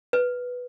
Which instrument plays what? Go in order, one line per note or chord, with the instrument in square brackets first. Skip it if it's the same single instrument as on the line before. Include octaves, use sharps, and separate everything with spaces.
[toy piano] B4